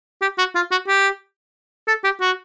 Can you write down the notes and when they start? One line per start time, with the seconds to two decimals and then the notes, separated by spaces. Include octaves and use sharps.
0.21 G4
0.38 F#4
0.55 F4
0.71 F#4
0.88 G4
1.87 A4
2.04 G4
2.21 F#4